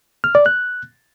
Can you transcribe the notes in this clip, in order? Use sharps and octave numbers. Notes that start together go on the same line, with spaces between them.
F6
D5
F#6